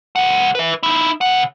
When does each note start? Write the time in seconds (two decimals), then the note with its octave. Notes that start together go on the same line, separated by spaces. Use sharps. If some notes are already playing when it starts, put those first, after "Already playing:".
0.16 C#2 F#5
0.55 B4 E5
0.83 D#4 E4
1.21 C#3 F#5